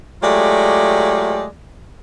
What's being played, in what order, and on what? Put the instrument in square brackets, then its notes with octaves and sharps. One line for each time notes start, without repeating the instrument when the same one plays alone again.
[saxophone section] F#3 G#3 A3 F4 G4 D5